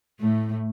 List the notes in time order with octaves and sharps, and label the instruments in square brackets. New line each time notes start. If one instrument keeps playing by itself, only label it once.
[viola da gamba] A2 A3